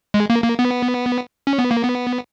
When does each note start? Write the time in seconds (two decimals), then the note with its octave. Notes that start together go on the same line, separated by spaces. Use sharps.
0.14 G#3
0.30 A#3
0.43 A#3
0.59 B3
1.47 C#4
1.59 B3
1.71 A#3
1.83 B3